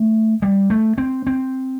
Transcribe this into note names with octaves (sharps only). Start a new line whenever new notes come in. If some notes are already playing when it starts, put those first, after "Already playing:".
Already playing: A3
G3
A3
C4
C4